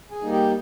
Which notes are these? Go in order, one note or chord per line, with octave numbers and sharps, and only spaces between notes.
G#4 G#5
G3 A#3 D#4
G4 G5